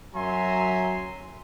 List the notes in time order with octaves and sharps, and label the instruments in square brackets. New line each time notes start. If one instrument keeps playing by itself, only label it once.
[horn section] F#2 F#3 E5 G#5 A#5 C6